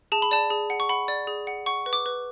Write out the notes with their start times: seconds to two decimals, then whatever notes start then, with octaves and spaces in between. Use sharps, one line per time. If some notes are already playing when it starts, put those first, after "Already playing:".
0.12 G#4 A5
0.22 B5
0.31 D5 A5
0.50 G#4
0.70 F#5
0.80 C#6
0.89 F#5 B5
1.08 D5
1.27 G#4
1.47 F#5
1.66 F#5 C#6
1.86 B4
1.93 D6
2.06 B4